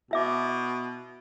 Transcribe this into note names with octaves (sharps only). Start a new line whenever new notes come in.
B2 E4 E5 D6